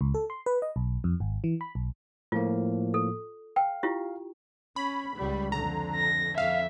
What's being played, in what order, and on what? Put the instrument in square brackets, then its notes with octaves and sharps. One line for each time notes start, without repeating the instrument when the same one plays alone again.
[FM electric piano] C#2
A4
C6
B4
D#5
B1
F2
G#1
E3
B5
B1
[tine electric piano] A2 F3 A#3 [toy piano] F4
[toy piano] A4
[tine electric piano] F5 [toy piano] G5
[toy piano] E4 F4 G4
[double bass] C#4 [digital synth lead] B5
[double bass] C#2 G3
[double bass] F2 D3 [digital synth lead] A#5
[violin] A#6
[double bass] F2 [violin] E5 [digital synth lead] F5